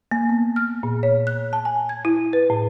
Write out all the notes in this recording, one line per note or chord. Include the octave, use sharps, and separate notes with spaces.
A#3
B3
F6
A#2
C#5
F#6
A5
G#5
G#6
E4
B4
A2